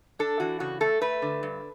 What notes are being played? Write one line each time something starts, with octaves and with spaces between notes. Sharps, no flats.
D4 A4
E3 F#4
C#3 F#4
A3 A4
A3 B4
D3
G2